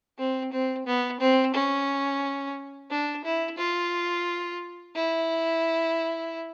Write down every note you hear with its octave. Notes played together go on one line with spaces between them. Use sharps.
C4
C4
B3
C4
C#4
D4
E4
F4
E4